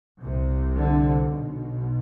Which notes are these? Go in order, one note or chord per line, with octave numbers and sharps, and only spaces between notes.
C2 C3
D3
B1 B2